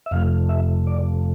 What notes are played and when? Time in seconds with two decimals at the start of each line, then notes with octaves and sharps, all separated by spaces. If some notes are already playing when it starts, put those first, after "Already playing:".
0.06 E5
0.11 F2 C3 F3 A3 F5
0.49 E5
0.87 D5